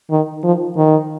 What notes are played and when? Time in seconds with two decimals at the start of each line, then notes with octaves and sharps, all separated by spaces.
0.10 D#3
0.44 F3
0.76 D#3